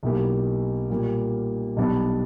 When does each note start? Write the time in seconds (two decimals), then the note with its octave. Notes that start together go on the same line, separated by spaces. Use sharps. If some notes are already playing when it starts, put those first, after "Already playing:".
0.03 B1 B2 A#3 E4 G4
0.90 A#2 G3 A#3
1.76 B1 B2 G3 B3 D4